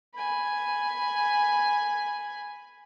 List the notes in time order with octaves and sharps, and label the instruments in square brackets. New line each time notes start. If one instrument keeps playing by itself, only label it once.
[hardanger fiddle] G#5 B5